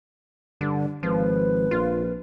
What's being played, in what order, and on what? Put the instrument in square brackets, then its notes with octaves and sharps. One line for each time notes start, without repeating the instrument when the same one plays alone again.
[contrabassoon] G2 [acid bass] D3
[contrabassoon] G#1 [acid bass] F3 [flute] B4
[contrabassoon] A#1 [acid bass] F4